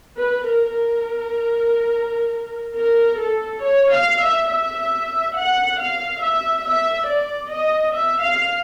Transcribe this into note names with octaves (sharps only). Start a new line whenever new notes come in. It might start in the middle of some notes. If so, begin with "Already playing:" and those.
B4
A#4
A#4
A#4
A4
C#5
F5
E5
E5
F#5
F5
E5
E5
D5
D#5
E5
F5